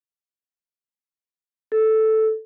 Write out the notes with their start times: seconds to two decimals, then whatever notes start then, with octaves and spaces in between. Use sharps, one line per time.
1.72 A4